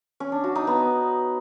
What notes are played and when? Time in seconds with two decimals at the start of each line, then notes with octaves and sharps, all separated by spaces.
0.20 C#4
0.32 D4
0.44 F#4
0.55 D#4
0.67 B3